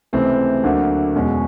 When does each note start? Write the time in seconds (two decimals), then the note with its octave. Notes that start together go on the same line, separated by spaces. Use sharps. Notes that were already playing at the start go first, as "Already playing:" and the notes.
0.13 C#2 C3 E3 A3 C4
0.63 D2 D3 F#3 A#3
1.15 E2 B2 G#3 C#4